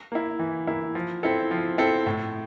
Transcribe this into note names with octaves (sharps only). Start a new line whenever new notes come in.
A#3 E4
E3
A#3 E4
F3
C4 E4 A4
F3
C4 E4 A4
A2